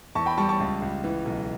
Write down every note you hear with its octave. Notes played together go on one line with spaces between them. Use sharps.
E2 A5 C#6
G5 B5
G3 A5 C#6
A5 C#6
C#2
C#2
E3
B1